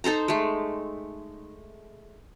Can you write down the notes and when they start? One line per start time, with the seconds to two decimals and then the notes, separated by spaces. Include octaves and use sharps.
0.04 D#4 A4 C5 A#5
0.28 G#3 A3